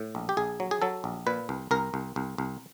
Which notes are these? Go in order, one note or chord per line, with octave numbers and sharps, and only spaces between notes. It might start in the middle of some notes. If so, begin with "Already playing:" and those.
Already playing: A2
A#1
G4
A#1 G#4
F#3
G#4
F#3 A4
A#1
A#2 B4
C2
C2 A#4
C2
C2
C2